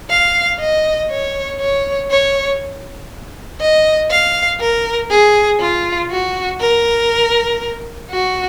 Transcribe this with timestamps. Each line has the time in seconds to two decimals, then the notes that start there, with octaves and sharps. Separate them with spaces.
0.10 F5
0.60 D#5
1.10 C#5
1.60 C#5
2.11 C#5
3.60 D#5
4.11 F5
4.60 A#4
5.11 G#4
5.60 F4
6.10 F#4
6.60 A#4
8.11 F#4